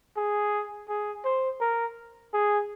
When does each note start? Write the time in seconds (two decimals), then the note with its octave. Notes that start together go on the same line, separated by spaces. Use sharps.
0.17 G#4
0.88 G#4
1.25 C5
1.61 A#4
2.33 G#4